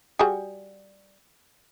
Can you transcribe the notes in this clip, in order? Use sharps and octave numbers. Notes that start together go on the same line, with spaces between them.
G3 F#4 G#4